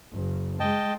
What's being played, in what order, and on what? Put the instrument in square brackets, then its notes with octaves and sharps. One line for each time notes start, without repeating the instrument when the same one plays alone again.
[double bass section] F#1
[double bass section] G#3 [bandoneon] D#5 G5 A5